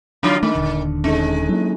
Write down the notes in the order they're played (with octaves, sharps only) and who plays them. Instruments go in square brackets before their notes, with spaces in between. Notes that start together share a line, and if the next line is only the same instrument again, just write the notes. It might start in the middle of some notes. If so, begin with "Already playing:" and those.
[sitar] D3 F#3 F4 [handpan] D4
[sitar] D#3 [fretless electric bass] A3
[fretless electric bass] D#1 D#2 D3
[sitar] G#3 [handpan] C#4 D#4 A4
[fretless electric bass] F#3 A#3 [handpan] E4